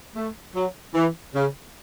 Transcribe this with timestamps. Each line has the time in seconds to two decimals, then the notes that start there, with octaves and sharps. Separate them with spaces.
0.15 A3
0.55 F#3
0.94 E3
1.33 C#3